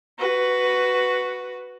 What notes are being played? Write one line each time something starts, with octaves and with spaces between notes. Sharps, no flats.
F#4 B4